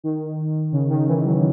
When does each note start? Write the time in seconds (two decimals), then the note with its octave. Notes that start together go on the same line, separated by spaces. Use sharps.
0.04 D#3
0.72 C#3
0.90 D#3
1.07 E3
1.24 F#3